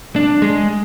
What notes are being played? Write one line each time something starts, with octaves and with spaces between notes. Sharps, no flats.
D4
G#3